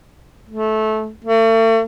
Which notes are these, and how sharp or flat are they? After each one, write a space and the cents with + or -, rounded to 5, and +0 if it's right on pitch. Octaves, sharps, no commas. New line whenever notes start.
A3 -20
A3 +40